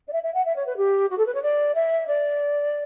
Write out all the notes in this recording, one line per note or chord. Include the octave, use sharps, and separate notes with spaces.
D5
E5
E5
F#5
E5
C#5
B4
G4
F#4
A4
B4
C#5
D5
E5
D5